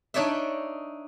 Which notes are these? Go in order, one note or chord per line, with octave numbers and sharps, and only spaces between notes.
D4 D#4 C#5 D5 E5